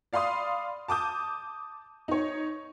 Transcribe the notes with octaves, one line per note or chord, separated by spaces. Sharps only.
D5 F5 B5 C6 D#6
A5 D6 D#6 G6
D#4 C#5